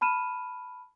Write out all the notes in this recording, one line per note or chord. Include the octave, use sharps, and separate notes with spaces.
A5 B5 F6 D#7 E7